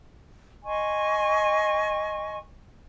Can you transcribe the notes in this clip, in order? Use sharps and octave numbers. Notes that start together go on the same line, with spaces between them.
D#5 G#5 C6 C#6